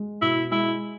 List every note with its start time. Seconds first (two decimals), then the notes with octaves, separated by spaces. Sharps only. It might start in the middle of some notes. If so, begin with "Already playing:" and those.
Already playing: G#3
0.22 B2 E4
0.52 G#3 E4